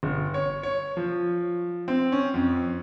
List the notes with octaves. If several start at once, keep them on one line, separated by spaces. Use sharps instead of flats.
G1
C#5
C#5
F3
C4
C#4
F2